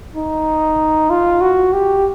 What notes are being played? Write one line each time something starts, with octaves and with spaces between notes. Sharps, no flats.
D#4
F4
F#4
G4